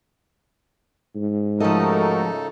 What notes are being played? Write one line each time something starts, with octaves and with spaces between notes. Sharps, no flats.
G#2
C#3 F3 A3 D#4 F#4 A4 A#4 D#5